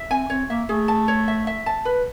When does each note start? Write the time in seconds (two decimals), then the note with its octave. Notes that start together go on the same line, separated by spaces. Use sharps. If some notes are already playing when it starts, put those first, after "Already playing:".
Already playing: E5
0.11 C4 G#5
0.30 C4 C#5
0.50 A#3 E5
0.69 A3 G#4
0.88 A5
1.08 C#5
1.28 E5
1.47 E5
1.66 A5
1.85 B4